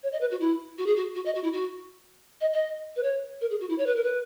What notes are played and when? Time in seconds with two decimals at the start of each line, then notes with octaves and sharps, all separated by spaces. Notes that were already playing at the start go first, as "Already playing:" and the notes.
0.03 C#5
0.12 D#5
0.20 B4
0.31 F#4
0.40 E4
0.78 F#4
0.86 G#4
0.96 F#4
1.15 F#4
1.25 D#5
1.34 F#4
1.43 E4
1.52 F#4
2.41 D#5
2.53 D#5
2.96 B4
3.02 C#5
3.41 A#4
3.50 G#4
3.60 F#4
3.69 E4
3.78 C#5
3.86 B4
3.95 A#4
4.03 B4